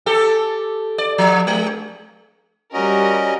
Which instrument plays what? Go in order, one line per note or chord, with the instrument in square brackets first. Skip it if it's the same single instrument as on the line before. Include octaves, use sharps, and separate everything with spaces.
[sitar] G4 A4
D5
F3
G#3
[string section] G3 A#4 [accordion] C#4 F#4 D#5